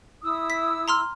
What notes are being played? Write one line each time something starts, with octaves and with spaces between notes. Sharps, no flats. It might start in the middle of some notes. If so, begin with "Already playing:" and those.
E4 D#6 E6
B6
A#5 C6 F6